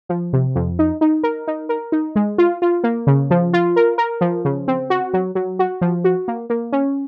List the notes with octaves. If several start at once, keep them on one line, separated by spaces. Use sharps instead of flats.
F3
C3
F2
D#4
D#4
A#4
D#4
A#4
D#4
G#3
F4
F4
A#3
C#3
F3
F4
A#4
A#4
F3
C#3
C4
F#4
F#3
F#3
F#4
F3
F#4
A#3
A#3
C#4